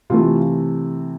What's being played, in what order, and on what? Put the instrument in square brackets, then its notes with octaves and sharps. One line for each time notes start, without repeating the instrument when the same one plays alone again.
[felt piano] C3 E3 A3 F4